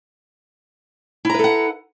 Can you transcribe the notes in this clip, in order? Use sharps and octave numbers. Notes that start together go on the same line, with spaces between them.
E4 A4 B4 F#5 A#5